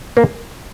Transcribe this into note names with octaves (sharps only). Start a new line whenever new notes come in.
A#3